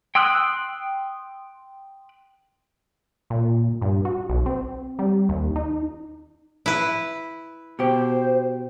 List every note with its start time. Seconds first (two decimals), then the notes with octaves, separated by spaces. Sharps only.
0.15 G5 C6 D#6 E6 F#6
3.30 A#2
3.81 G2
4.05 F#4
4.30 B1
4.46 C4
4.99 G3
5.29 D#2
5.56 D#4
6.66 E4 B4
7.79 B2 G4 C5